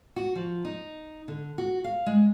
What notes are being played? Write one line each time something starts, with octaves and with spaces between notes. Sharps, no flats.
F#4
F3
D#4
D3
F#4
F5
G#3